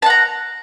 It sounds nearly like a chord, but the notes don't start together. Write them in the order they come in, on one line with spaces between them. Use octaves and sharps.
A5 F#5 A#5